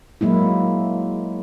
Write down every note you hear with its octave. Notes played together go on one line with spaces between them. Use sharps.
F#3 G#3 A#3 E4